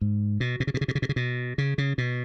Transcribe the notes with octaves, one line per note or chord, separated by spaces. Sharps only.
G#2
B2
B2
C#3
B2
C#3
B2
C#3
B2
C#3
B2
C#3
C#3
B2